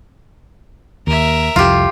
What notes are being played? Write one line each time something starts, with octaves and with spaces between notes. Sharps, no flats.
D#2 A#4 E5
C2 F2 F4 G4